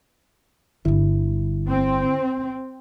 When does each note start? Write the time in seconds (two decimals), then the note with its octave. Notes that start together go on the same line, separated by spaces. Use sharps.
0.85 G1 D3 G3 E4
1.69 C4